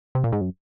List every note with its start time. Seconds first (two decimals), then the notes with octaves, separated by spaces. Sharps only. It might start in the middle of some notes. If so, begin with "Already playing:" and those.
0.15 C3
0.24 A#2
0.32 G#2
0.41 F#2